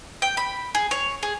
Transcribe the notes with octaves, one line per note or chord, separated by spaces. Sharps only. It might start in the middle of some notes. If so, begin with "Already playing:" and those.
G5
B5
G#4
C#5
G#4